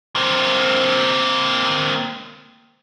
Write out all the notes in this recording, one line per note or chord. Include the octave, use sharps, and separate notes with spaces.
A#3 C4